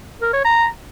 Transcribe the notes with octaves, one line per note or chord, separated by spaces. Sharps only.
A#4
C#5
A#5